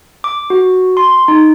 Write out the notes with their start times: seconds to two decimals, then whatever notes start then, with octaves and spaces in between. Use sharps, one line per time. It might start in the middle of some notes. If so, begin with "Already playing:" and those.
0.24 D6
0.50 F#4
0.97 C6
1.28 D#4